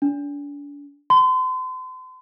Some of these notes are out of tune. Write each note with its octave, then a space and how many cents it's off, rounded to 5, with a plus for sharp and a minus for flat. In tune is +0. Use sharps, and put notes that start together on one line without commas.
D4 -35
C6 -40